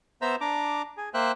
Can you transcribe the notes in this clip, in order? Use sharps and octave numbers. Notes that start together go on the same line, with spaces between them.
B3 C5 E5 A#5 E6
D4 A#5 D6
G#4
A#3 C5 E5 G5 F#6